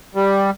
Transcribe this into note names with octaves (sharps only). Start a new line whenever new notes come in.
G3